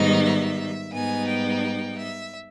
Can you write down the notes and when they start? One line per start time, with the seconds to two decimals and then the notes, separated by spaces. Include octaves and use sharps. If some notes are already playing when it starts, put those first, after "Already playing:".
Already playing: G#2 D#3 G3 B3 D#4 D#5
0.23 E5
0.93 G#2 G3 B3 D#4 G#5
1.28 G5
1.98 E5